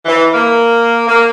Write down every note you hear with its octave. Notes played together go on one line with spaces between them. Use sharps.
E3
A#3
A#3